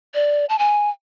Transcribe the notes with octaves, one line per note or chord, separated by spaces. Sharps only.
D5
A5
G#5